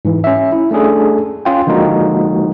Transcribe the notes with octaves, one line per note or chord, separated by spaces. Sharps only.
G#2 E3
C#4 E5
E4
A3 C#4 D4 G#4 A4
C#4 F4 G5
D3 F3 G#3 A#3 D#4 F#4